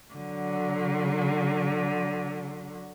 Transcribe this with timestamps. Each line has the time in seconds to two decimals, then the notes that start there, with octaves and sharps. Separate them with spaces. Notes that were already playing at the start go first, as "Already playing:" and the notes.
0.14 D3 F#3